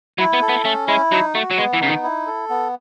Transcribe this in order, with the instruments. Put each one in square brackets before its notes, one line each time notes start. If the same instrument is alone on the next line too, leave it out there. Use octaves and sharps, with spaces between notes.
[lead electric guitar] F#3 [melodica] E4
[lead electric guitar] B3
[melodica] A4
[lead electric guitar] B3
[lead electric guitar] A3 [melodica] C#4
[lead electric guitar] G#3 [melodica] E4
[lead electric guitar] F#3 [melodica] D#4
[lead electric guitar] A3 [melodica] F#4
[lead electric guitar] F#3
[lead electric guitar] G#3 [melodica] B3
[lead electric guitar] E3
[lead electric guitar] C#3 [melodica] D#4
[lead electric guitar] D#3
[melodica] E4
A4
B3